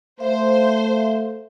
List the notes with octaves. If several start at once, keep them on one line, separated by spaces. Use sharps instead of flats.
A3 C5 E5 F5